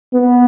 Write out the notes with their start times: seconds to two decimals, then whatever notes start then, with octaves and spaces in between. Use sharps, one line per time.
0.14 B3